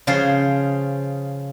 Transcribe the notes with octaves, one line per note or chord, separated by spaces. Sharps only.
C#3 F3 F4 G#4 C5